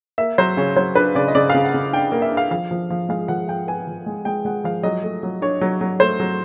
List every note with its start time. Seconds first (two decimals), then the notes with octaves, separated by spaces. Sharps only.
0.18 A#3 E5
0.38 F#3 C5
0.57 C#3 C#5
0.76 F#3 C5
0.95 D4 B4
1.15 C#3 D5
1.28 D#5
1.35 C#3 D5
1.50 C#3 F5
1.65 F#5
1.74 C#3
1.93 D4 G5
2.12 A#3
2.22 E5
2.32 D4
2.37 F5
2.51 F3 F5
2.71 F3
2.90 F3
3.09 G#3 F5
3.28 F3 F#5
3.48 F3 G5
3.67 B3 G#5
3.87 F3
4.06 G#3
4.25 G#3 G5
4.45 G#3 F#5
4.64 F3 F5
4.83 F#3 D#5
5.03 A3
5.23 F#3
5.42 D4 C#5
5.61 F#3
5.81 F#3
6.00 A3 C5
6.20 F#3